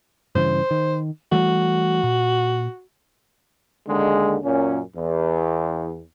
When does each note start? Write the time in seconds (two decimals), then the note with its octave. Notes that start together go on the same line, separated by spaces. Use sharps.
0.35 G2 C#3 E3 C5
0.71 D#3
1.32 E3 G3 A3 F#4
2.04 A#2
3.87 D#2 D3 G#3
4.44 F#2 A#2 C#4
4.95 E2